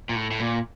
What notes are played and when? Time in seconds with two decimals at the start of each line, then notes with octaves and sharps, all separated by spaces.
0.09 A#2
0.16 A2
0.31 A2
0.40 A#2